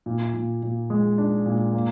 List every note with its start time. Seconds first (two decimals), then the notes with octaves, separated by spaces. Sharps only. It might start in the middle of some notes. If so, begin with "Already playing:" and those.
0.06 A#2
0.34 A#2
0.63 A#2
0.90 G#3
1.18 D4
1.46 A#2
1.73 A#3